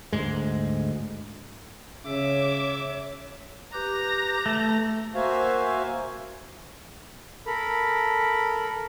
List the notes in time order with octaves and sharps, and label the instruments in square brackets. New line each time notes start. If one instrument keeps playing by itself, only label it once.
[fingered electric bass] D2 G#2 G#3
[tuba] C#3 [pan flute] C#5 [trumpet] E5 [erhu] D6
[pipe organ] G4 B4 G6 [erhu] A#5
[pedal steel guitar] A3
[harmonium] A#3 F#4 C5 E5 F5 G#5
[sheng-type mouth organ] A4 A#4 B5